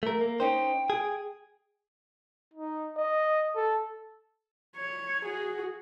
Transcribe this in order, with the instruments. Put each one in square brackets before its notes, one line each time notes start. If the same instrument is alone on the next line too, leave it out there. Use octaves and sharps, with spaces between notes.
[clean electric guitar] A3 A#4
A#3
[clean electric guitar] C#4 D#4 C5 [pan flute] G5
[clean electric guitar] G#4
[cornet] D#4
D#5
A4
[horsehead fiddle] C#5
F#4 G#4